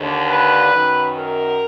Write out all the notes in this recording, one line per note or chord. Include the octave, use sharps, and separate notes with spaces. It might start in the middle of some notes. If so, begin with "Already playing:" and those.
Already playing: D#2 D3
B4
F#2 D#3
A#4